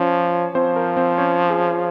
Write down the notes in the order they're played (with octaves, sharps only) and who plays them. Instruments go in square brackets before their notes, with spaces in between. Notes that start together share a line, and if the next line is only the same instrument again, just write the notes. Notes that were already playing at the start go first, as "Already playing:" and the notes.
Already playing: [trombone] F3 [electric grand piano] C#4 C#5
[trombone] F3 [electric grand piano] C4 C5
[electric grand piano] A#4
C4 C5
C#4 C#5
G#4